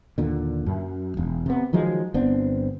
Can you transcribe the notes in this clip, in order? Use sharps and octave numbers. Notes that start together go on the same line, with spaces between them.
D#2 A#2 D3
F#2
E1
C3 B3
D#3 F3 F#3 G#3
G1 B3 C4 D4